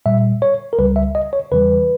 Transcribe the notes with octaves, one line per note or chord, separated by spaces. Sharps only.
A#2 G3 E5
C#5
A#4
C#2 C#3 G3 B4
E5
D#5
C#5
E2 C#3 E3 G3 B4